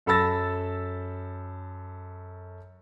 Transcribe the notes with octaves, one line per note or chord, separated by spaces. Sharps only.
F#2 A4 B5 E6 A6 A#6